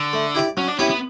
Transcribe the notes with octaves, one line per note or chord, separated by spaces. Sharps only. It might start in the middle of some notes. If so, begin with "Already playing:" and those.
Already playing: D3
A3
E4 G4 D5
F#3 C#4
D4
B3 C#4 E4 G4 C#5
B3